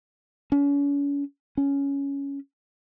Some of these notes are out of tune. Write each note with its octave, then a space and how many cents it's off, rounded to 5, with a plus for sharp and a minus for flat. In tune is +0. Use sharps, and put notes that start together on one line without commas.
C#4 +40
C#4 +10